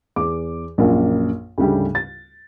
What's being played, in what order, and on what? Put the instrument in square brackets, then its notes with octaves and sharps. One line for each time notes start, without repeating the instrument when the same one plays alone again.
[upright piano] E2 D6
A#1 F#2 A#3
D2 G#2 C#3 G3 A3 G4
A6